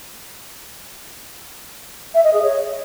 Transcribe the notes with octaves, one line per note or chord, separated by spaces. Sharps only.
E5
D#5
G#4
C#5